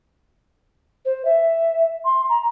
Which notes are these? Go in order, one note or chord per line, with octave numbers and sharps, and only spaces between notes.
C5
E5
C6
A#5